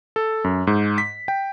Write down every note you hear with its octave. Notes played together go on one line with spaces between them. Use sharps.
A4
F#2
G#2
B6
G5